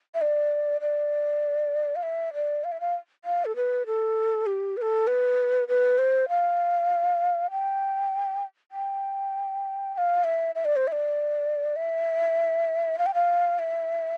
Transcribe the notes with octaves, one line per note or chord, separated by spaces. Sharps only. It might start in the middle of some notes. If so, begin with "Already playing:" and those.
E5
D5
D5
F5
E5
D5
F5
E5
F5
F5
A4
B4
A4
G4
B4
A4
B4
B4
C5
F5
G5
G5
G5
F5
E5
E5
D5
C5
E5
D5
E5
F5
G5
F5
E5